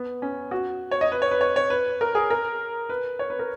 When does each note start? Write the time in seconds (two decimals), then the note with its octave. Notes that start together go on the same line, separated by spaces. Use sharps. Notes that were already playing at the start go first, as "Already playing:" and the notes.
Already playing: B3
0.22 C#4
0.51 F#4
0.91 C#5
1.01 D#5
1.12 B4
1.22 C#5
1.31 B4
1.41 C#5
1.56 C#5
1.70 B4
2.01 A#4
2.15 G#4
2.30 A#4
2.89 B4
3.19 C#5
3.30 B4
3.39 A#4